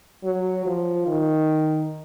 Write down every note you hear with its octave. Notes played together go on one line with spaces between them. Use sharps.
F#3
F3
D#3